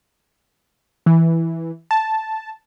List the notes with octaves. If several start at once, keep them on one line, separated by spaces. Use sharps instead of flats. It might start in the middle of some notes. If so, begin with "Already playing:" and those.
E3
A5